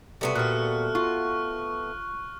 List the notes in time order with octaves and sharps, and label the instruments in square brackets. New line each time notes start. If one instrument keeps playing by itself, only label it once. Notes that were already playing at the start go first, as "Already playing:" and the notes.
[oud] C3 G3 [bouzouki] A3 B3 F#4
[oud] A#2 G3 [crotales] F6 F#6
[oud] F4 [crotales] C#6